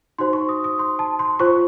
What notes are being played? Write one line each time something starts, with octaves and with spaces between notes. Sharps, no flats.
D#4 F#4 C5 C6
C#6
D#6
D#6
C6
A5
C6
F4 C5 C#6